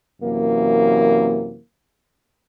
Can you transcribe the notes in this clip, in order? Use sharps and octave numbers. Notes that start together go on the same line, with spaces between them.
F#2 C3 E3 A#3